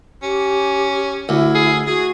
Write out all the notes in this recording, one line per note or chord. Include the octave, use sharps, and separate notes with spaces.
C#4 G4
D2 E4
G#4
F#4 G#4